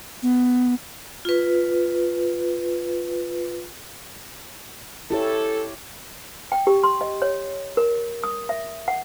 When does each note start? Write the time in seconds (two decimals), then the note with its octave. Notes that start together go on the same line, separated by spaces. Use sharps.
0.23 B3
1.25 F4 B4
5.10 E4 G4 A4 C#5
6.52 G5
6.67 G4
6.84 C6
7.01 D#5
7.22 C#5
7.77 A#4
8.24 D#6
8.49 E5
8.88 F#5